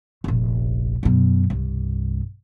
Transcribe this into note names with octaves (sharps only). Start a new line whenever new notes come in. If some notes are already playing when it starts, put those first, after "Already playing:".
F1 A#1
F#2 B2
C2 G2